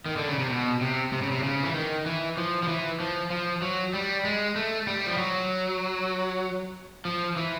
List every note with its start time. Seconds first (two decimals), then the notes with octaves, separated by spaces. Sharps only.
0.06 D#3
0.17 D3
0.28 C#3
0.39 C3
0.50 B2
0.81 C3
1.12 C3
1.22 C#3
1.32 C3
1.43 C#3
1.63 E3
1.75 D#3
2.06 E3
2.37 F3
2.63 F3
2.68 E3
3.00 F3
3.30 F3
3.62 F#3
3.94 G3
4.25 G#3
4.56 A3
4.87 G3
5.07 F3
5.18 F#3
7.05 F3
7.37 E3